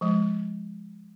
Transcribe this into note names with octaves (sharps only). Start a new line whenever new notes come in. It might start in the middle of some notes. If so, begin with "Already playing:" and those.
F3 G#3